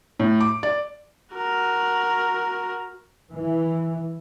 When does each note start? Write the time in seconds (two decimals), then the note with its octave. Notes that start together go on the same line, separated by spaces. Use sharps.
0.20 A2
0.41 D6
0.63 D5
1.35 F#4 A#4
3.33 E3